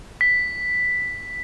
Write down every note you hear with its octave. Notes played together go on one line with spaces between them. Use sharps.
B6